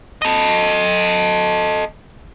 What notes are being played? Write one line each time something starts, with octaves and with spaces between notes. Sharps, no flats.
A4 D#5